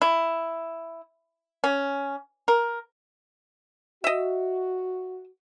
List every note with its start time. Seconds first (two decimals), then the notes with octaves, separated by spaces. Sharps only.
0.02 E4
1.64 C#4
2.48 A#4
4.04 F#4 D#5 E5